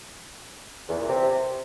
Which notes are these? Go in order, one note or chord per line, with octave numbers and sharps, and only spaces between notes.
E2
A#2
C3